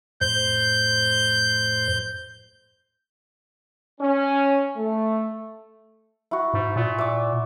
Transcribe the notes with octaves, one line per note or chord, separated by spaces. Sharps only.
F2 A2 C5 G6
C#4
A3
E4 F#4
G#2
A#2
E5 D6